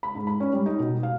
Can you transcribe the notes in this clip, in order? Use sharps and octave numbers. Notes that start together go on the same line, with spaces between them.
B5
G#2
B5
C#4
G3
D#4
B2
F5